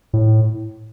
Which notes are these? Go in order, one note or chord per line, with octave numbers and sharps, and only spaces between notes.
A2